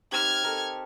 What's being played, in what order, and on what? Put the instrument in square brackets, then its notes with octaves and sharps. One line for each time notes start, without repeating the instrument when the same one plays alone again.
[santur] C4 D#4 G4 [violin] F6 G#6
[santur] A4 A#4 D#5